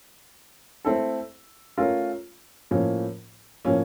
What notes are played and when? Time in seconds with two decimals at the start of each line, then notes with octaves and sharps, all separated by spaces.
0.85 A3 C4 E4 A4
1.77 A3 C#4 F4 A#4
2.71 A2 F3 A#3 C#4
3.65 A2 F3 A#3 C#4